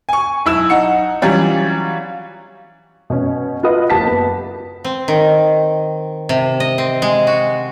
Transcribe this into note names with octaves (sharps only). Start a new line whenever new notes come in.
G#5 C#6
B1 E4 E6 E7
D#4 F#5 C#7
E3 F#3 G3 C#4 F4
B2 C#4
F4 F#4 B4 D#5 D#6
F#1 G4 A5 B6
B3
C4
D#3
C3
D#5
C4
G#3
F#4